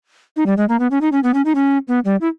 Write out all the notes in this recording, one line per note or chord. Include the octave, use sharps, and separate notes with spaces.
D#4
G3
G#3
A#3
B3
C#4
D#4
C#4
B3
C#4
D#4
C#4
B3
G3
E4